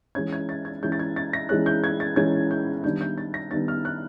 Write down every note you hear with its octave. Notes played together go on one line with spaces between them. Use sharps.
E3 G#3 C#4 G#6
G#6
A6
G#6
E3 G#3 C#4 G6
A6
G#6
A6
A#6
E3 G#3 C#4 F#6
G6
G#6
A6
E3 G#3 C#4 G#6
G6
D#3 G3 B3 D4 G6
G6
A6
A#6
D#3 G3 B3 D4 A6
F6
F#6